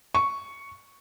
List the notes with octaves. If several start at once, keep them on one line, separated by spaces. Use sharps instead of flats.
C#6